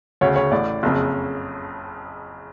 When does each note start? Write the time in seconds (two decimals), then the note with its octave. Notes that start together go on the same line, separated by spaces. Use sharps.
0.21 D2 C#3 C#5
0.36 C#5
0.52 A1 A2 D5
0.83 F#1 F2 C#3